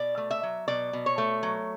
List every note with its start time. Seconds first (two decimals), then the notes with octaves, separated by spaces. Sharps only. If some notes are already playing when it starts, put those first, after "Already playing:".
Already playing: B2 D5
0.17 A3
0.31 E5
0.43 F#3
0.68 B2 D5
0.93 B2
1.06 C#5
1.18 A3
1.43 F#3